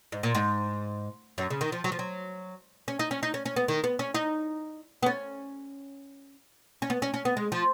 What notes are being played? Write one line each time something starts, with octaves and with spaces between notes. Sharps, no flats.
G#2
A#2
G#2
F#2
C#3
D#3
F3
F#3
F3
F#3
C#4
D#4
C#4
D#4
C#4
C#4
B3
D#3
B3
C#4
D#4
B3
C#4
C#4
B3
C#4
C#4
B3
G#3
F3